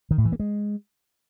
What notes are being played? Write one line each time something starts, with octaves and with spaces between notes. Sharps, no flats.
D#3
A2
E3
A#3
G#3